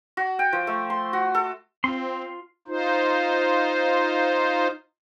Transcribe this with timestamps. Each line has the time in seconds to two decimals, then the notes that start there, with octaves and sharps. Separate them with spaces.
0.17 F#4
0.39 G5
0.53 F3
0.67 A3
0.90 C6
1.13 F#4
1.35 A4
1.84 C4 F4 C6
2.68 D#4 F4 C5